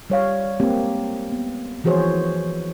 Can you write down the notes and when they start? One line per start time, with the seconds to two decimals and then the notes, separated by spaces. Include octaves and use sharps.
0.10 G3 C#5 F5
0.60 G#3 A#3 C4 G4
1.32 B3
1.84 E3 F3 F#4 G#4 C5 C#5